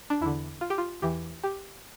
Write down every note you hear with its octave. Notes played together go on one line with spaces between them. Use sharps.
D4
E2 D3 E4
F4
G4
F4
E2 E3 G4
G4